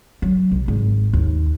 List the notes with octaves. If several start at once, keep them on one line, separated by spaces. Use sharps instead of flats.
F#3
B1
G#1
D#2